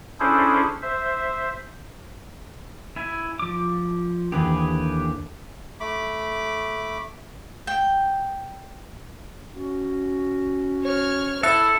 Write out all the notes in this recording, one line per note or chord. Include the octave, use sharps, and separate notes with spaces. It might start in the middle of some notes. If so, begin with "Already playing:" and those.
C#4 D4 E4 G#4 A4 C5
C5 E5
E4 G#5
F3 D6
D#2 D3 E3 G4 G#4 B4
A3 B5 D6
G5
C#4 F#4
C#5 F6
E4 A4 E5 F#6 A6